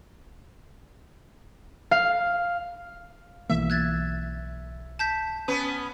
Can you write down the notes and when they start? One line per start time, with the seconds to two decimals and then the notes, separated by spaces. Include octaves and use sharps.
1.91 F5
3.50 B1 E3 A#3 E5
3.70 F#6 G#6 A6
4.99 A5 G6 B6
5.48 B3 C#4 B4